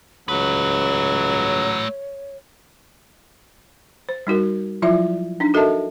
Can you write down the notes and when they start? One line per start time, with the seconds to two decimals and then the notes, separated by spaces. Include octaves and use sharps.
0.28 C#2 F#3 A3 B4 C#5
4.09 C5
4.27 G3 D#4 F#4 A#4
4.82 F3 F#3 E4 F4 D5 E5
5.40 D4 D#4
5.54 F#4 A4 A#4 D#5 E5 A5